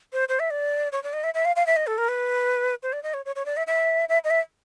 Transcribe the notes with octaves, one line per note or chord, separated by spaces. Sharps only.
C5
C5
E5
D5
C#5
D5
D#5
E5
E5
F5
F5
E5
D#5
A4
A#4
B4
C5
D5
D#5
C#5
C#5
C#5
D5
E5
E5
E5
D#5
E5